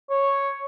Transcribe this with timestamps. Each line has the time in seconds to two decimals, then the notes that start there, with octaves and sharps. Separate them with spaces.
0.10 C#5